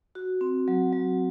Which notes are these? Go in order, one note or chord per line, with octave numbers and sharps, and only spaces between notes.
F#4
C4
F#3
F#3